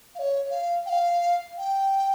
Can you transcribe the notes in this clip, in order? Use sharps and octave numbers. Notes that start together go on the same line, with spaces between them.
F5
C#5
F5
G5
F5
G5